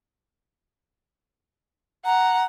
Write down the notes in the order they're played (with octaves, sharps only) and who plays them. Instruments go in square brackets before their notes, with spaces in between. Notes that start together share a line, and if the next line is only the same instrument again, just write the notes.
[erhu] F#5 [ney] A#5